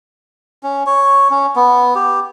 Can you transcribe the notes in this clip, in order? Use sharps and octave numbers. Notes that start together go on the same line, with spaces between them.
C#4
C#5
C#4
B3
G4